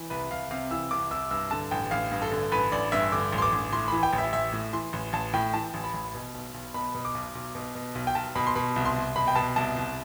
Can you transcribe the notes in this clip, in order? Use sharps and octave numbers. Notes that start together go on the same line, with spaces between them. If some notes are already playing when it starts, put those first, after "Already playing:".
Already playing: E3
C2 B4
C2 F5
C3 F5
E3 E6
C2 D6
C2 E6
G2 E6
D3 A5
A1 G5
A1 F5
G2
A4
D3
A1 B4
A1 D5
G2 E5
D3 D6
A1
C6
D6
A1
A2 C6
E3 B5
G5
A1
E5
A1 E5
A2
E3 C6
A1
A1 A5
A2 G5
E3 A5
A1
B5
A1
B2
B1
B1
B2 B5
B2
D6
B1
B1
B2
B2
B1
G5
B1 A5
B2 B5
C6
B2 B5
C2
C6
C2
B2 B5
G5
B2 A5
C2 A5
C2